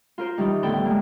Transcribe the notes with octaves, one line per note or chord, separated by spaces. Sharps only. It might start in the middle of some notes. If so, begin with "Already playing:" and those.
F4 A#4 C5
D#3 E3 G3 D#4
A2 D3 B3 A4 G5
G#3 A#3